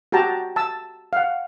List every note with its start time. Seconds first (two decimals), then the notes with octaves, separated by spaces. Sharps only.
0.12 F#4 G4 G5 A5 A#5
0.56 A5 E6
1.13 F5 F#5